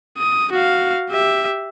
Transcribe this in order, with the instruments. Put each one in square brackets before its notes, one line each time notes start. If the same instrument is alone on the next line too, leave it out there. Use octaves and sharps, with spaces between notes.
[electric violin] D#6
F#4 F5
G4 E5